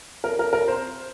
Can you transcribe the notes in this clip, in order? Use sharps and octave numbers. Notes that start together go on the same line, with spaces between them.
A#4
A#4
A#4
C5